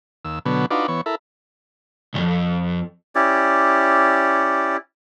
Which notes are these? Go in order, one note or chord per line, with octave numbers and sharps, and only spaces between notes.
D#2 E6
B2 D3 F#3 B3
D4 D#4 F4 F#4 B4 D6
E3 B3 C#5 C#6
E4 A4 A#4 E5
C2 F2
C#4 E4 G4 D5